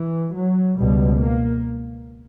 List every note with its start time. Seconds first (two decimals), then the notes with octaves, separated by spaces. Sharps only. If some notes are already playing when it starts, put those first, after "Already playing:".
Already playing: E3
0.33 F#3
0.77 C#2 B2 G3
1.21 A#3